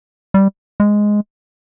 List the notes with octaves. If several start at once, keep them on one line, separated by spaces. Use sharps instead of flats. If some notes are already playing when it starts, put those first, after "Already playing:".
G3
G#3